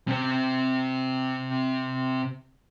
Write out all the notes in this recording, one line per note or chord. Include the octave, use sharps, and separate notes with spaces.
C3 C4